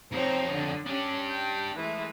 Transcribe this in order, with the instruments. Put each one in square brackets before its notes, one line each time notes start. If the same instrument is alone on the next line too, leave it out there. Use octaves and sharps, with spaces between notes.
[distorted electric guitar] F2 D#4 [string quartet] C4 C#5
[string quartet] D3
[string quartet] C#4 [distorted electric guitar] D4 G4
[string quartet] G5
E3 G#3 A3